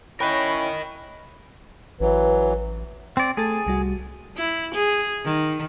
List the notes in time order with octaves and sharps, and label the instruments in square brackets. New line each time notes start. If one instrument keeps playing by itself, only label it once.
[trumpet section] C#4 E4 C#5 [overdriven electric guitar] A#4 D#5 [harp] G5 B5 F#6
[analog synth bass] A1 [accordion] E3 F#3 [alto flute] B4
[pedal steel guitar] C4 D5
[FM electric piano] A3 A4 A6 [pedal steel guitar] G#4
[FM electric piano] C2 G3 F#4
[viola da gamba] E4
G#4
D#3